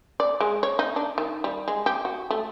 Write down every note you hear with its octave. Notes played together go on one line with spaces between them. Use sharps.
D5
G#3
C#5
D#4
D4
D#3
G3
G#3
G4
F#4
A3